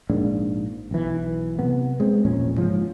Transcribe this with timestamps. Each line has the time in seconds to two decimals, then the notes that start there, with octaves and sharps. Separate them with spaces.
0.10 A#1 G#2 A#3 D4
0.91 B1 E3
1.59 C3 B3
2.00 G#3 C4
2.25 E1 A#1 A#2 C#4
2.57 G#2 C#3 F3 C#4